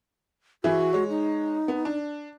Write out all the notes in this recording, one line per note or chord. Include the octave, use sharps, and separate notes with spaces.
E3 E4 F#4 G#4
G#3 C#5
D#4
B3
D4